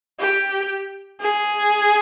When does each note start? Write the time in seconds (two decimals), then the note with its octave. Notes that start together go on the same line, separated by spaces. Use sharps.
0.20 G4
1.21 G#4